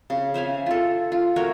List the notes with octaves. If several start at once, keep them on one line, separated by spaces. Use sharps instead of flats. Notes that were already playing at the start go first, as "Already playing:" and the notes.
C#3
C5 E5 F5 G#5
F4 A4
F4
A3 F#4 A#4 C#5